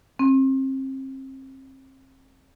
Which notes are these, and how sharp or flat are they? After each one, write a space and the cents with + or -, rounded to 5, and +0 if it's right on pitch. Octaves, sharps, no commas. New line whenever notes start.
C4 +35